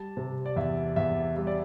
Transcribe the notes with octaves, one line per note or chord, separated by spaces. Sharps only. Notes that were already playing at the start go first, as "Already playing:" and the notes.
Already playing: G3 A5
C3
D5
E2 E5
E2 E5
G3 E5
D5